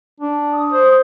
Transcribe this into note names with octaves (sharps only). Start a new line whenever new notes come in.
D4
D#6
C5